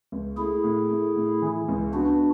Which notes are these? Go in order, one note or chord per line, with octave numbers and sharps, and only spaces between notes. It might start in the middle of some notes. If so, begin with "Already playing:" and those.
C#2
A3 E4 G#4
A2
A3
A2
E3
C#2
B3 D4 F#4